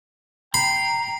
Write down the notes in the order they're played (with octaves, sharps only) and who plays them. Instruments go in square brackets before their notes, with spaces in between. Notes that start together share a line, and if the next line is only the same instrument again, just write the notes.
[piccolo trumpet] G5 [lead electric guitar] A#5 [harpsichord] B5 [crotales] C7